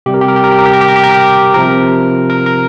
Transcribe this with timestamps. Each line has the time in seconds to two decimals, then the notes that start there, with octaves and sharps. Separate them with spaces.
0.06 C3 G3 G4
0.14 A#4
0.21 G4
0.28 A#4
0.36 G4
0.44 A#4
0.52 G4
0.59 A#4
0.66 G4
0.73 A#4
0.81 G4
0.88 A#4
0.96 G4
1.04 A#4
1.11 G4
1.54 C3 F3 A#4
2.30 A#4
2.46 A#4